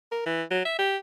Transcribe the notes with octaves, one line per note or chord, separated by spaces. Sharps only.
A#4
E3
F#3
E5
G4